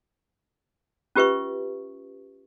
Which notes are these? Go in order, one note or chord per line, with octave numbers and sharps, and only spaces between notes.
C#4 F4 G4 B4 E5 C#6